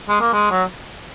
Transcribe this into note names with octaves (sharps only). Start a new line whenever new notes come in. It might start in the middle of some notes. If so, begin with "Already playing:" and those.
G#3
A#3
G#3
F#3